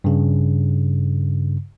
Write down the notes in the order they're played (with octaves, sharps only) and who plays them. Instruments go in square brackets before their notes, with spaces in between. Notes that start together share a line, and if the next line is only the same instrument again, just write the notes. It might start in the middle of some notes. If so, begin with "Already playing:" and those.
[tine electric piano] G2 C#3